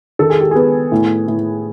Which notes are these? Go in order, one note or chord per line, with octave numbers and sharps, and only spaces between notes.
D#3 A4
G#4
G4
B3 G#4
A2
A2